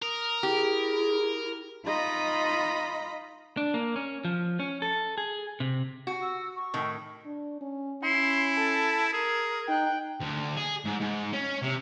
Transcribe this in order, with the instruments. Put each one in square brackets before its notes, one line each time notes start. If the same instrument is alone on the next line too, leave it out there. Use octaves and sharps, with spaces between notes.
[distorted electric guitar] A#4 [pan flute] D#6
[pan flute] E4 [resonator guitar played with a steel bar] G4 [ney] G#4
[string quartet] D#4 F4 D#5 A#5 B5
[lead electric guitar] D4
A#3
C#4
F3
C#4
A4
G#4
C3
[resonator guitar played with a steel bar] F#4
[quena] E6
C#6
[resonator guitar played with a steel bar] A2 D#3
[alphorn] D4
C#4
[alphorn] C#4 [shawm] E4 [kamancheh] C6
[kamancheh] A4 A5
[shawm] G#4 [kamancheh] A#4
[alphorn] D#4 [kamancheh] G5 F#6
[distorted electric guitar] D2
G#4
G#2
G#2
C#4
C3